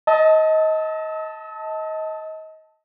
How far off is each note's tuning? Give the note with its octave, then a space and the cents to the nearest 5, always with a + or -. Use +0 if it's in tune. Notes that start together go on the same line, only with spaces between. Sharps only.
D#5 +25 A5 +0 E6 -35